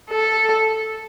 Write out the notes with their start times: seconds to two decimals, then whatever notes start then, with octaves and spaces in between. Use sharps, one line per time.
0.10 A4